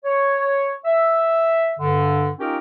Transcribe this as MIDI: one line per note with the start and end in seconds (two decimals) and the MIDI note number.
0.05 0.74 73
0.85 1.72 76
1.80 2.28 43
1.80 2.28 50
2.39 2.58 61
2.39 2.58 63
2.39 2.58 65
2.39 2.58 67
2.39 2.58 70
2.39 2.58 79